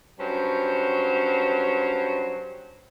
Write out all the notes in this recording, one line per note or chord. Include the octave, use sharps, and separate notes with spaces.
G2 F#3 C#4 C5